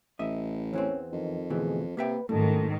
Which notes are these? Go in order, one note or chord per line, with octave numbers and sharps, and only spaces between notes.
A1 D#5 E5
E2 E3 C4 C#4
F2 D#3
D2 B2 E3 G#4
C3 A#3 B4 E5 G5
F#1 G#2 D#3 A3 A4